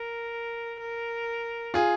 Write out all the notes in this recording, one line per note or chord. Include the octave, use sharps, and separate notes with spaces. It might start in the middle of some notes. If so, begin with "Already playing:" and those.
Already playing: A#4
A#4
F4 G#4